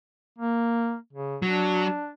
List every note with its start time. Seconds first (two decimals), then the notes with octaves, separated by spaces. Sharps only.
0.38 A#3
1.13 C#3
1.42 F#3 D4